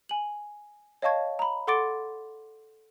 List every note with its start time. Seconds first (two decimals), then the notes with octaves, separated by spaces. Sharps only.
0.09 G#5 F#7
1.02 C#5 D#5 F5 A5 C#6 G#6
1.39 A#5 B5
1.67 A4 F#5 C6 D6 A6 D7